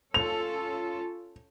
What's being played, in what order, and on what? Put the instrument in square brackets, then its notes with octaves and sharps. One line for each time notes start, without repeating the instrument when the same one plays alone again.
[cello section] C#4 F4 A4 [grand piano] F7